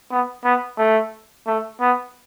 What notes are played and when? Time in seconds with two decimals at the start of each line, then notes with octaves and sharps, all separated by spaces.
0.11 B3
0.45 B3
0.78 A3
1.47 A3
1.81 B3